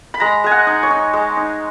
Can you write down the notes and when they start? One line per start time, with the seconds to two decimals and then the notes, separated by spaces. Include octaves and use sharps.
0.14 B5
0.20 G#3 A#5
0.44 G#3 G#5
0.52 F#5
0.67 D#4
0.83 C#5
0.91 D#4
1.13 G#3
1.37 D#4